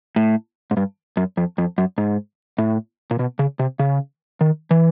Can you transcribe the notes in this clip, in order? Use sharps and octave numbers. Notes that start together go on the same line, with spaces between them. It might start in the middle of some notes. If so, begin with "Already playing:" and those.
A2
G#2
G2
F#2
F2
F2
F#2
G#2
A2
A#2
B2
C#3
C3
C#3
D#3
E3